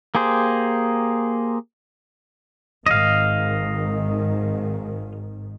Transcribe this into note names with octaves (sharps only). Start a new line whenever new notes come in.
A#3 G4 G#4 C5
G#1 G#2 D#3 D#5 F5